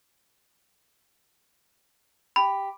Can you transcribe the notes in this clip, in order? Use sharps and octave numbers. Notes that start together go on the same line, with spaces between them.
G4 B5